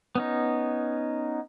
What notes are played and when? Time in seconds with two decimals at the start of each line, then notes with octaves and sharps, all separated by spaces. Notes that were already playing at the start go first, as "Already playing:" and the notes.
0.15 B3 C#4 D#4